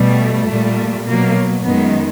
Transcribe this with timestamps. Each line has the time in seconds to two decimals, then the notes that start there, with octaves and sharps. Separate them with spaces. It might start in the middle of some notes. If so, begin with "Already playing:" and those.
Already playing: B2 G3 A3
0.47 A#2 G3
1.06 B2 F#3 A#3
1.63 F#2 D#3 G#3 B3